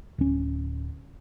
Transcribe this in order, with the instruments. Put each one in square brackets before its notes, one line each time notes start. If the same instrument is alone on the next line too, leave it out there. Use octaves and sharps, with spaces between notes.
[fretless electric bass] D1 C#4